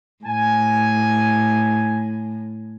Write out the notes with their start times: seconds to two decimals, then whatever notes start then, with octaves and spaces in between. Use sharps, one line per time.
0.25 A2 G#5